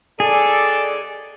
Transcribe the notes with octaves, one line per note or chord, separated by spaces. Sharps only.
D#2 G#4 A4 D5